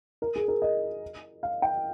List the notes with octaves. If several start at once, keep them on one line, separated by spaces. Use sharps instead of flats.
A#4
G#4
A#4
D#5
F5
G5